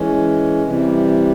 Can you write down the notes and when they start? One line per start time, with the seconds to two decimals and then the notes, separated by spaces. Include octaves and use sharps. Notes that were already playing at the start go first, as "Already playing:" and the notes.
Already playing: E3 G#3 C#4
0.64 C3 E3 G3